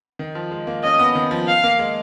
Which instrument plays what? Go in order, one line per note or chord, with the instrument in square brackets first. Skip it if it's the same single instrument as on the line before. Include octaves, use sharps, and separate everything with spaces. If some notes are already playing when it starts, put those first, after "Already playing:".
[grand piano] D#3
F3
G#3
A#3
[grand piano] C#4 [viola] D#5
[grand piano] B3
D#3
F3
[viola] F5
[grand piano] A#3
G#3